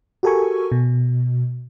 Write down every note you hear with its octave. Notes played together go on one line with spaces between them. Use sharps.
F#4 G4 A4 A#4 G#5 C#6
B2